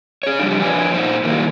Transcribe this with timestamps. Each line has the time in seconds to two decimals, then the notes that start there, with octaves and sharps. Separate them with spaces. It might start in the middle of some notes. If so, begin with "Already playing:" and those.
0.23 G#4 C#5
0.39 C#3 F3 G3 D4
0.62 F3 D4 B4 C#5 G#5
0.94 A#2 D#4 C5
1.24 D#3 F#3 G3 A3 A#3 E4